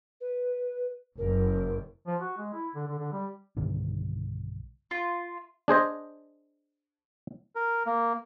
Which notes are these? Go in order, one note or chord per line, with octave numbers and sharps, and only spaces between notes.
B4
F#1 F#2 A#4
F3
F#4
G#3
E4
D3
D3
D3
G3
B1 G2 D3 D#3
F4
D4 G#4 C5 D#5
A#4
A#3